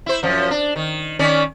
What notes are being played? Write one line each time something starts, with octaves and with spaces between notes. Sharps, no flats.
E4 C5
F#2 F3
D4
D#3
D#3 C#4 D5